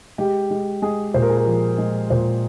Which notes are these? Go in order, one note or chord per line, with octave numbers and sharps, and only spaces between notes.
G#3 G4
G#3
G#3 G#4
A#2 C5
A#4
G#4
A#4
F3
G#3
A#2 C5